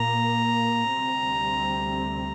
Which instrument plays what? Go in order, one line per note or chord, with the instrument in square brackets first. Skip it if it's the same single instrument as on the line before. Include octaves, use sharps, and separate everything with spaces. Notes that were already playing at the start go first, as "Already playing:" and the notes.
Already playing: [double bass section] A#2 A#3 [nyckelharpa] A#5
[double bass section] D2 C3 G3 C4